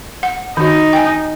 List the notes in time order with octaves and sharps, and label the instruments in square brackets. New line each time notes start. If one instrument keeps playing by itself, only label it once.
[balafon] F#5
[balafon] D#3 F#4 [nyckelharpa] D#4
[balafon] G5 G#5